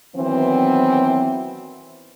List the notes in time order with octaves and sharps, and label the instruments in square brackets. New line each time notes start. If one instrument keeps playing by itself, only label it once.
[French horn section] D#3 E3 F#3 B3 C4